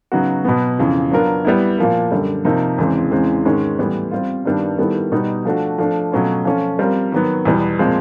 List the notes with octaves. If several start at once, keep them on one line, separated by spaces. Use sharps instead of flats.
C#3 F#3 B3 D#4 F#4
B2 F#3 B3
F2 C#3 E3
F#3 B3 D4 F4 A#4
G3 B3 E4
A#2 F3 A#3
F#2 D3 G3
C3 F3 A#3 D#4
E2 C#3 E3 G#3 C4
E2 C#3 E3 G#3 C4
G#2 D#3 G#3 C#4
A2 E3 G3 B3
G3 C4 F4
G2 D#3 G3 B3 D4
D#3 G3 B3 E4 A4
B2 G3 B3 D#4
F3 A3 D4 F#4
F3 A3 D4
B2 F#3 A3 C#4 F4
F3 A3 C#4 F4
G3 C4 F4 A#4
D#3 F#3 B3
E2 B2 G3 B3
A#2 F3 G#3 C4